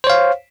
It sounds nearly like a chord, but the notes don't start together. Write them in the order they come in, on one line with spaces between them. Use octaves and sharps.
C5 C#5 F5